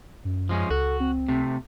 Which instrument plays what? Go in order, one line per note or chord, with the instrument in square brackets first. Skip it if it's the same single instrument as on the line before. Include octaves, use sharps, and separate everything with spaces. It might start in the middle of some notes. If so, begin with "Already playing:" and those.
[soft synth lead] F#2
[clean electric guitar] F3 G#3 C#4
[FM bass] C#2 [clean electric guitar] F#4 [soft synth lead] A4
[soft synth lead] C4
[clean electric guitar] C3 A3